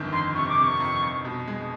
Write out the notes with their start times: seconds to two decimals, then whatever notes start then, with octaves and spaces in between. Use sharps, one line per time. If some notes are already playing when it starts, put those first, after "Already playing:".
Already playing: G1 F2 D#3
0.13 F2 C6
0.35 C3 C#6
0.49 D6
0.58 C3
0.63 C#6
0.80 F2
1.02 F2
1.25 B2
1.47 G#3